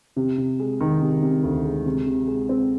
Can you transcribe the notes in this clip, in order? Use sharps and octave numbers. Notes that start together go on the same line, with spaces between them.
C3
C3
G#3
D#3
C3
C3
D2
G#3
C3
C3
G#3
C4